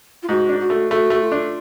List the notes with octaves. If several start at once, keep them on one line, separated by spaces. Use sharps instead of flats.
F4
G#2 F#4
D4
F#4
A3
A3 F#4
A3
F4
D4